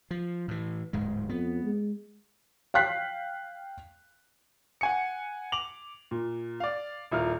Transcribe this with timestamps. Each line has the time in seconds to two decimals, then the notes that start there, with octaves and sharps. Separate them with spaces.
0.11 F3
0.48 A2 E3
0.93 D1 G#2 G#3
1.29 F2 B3
1.63 G#3
2.74 F5 G5 F#6 B6 C7
4.81 F#5 G#5 C#7
5.52 D6 F7 F#7
6.11 A#2
6.60 D5 F5
7.11 D#1 E4 F4 A#4 F6